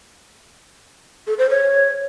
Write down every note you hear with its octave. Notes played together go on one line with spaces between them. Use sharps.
A4
C5
C#5